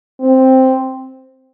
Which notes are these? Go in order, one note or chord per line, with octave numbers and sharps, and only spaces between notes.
C4